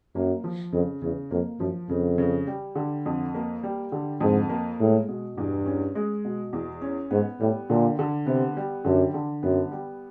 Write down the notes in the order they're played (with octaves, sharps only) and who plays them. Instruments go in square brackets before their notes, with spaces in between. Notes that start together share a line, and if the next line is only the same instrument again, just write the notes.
[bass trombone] F#2 [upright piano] A#3
[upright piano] F3
[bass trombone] F2 [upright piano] C#3
[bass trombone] E2 [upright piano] C#3
[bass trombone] F2 [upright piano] A#3
[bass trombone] F#2 [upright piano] F3
[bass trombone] F2 [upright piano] C#3
[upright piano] C#3
G3
D3
F2
A#3
G3
D3
[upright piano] F2 [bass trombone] G#2
[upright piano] A#3
[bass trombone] A2 [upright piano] G#3
[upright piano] B2
[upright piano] E2 [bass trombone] G2
[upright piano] C#4
G#3
B2
E2
C#4
[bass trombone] G#2 [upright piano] B3
[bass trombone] A2 [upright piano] G3
[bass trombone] A#2 [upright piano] D3
[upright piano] D3
[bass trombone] C3 [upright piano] B3
[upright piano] G3
[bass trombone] F#2 [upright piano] D3
[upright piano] D3
[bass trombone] F#2 [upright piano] B3
[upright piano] G3